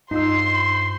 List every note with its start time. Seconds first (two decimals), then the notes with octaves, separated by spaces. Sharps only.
0.11 G2 D#4 F4 C5 C6 E6